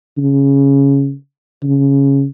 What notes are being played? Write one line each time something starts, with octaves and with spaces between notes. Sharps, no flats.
C#3
C#3